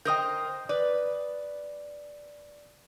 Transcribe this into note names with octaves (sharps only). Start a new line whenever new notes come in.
A#4 C5 D#5 G5 D#6 G6
B4 D5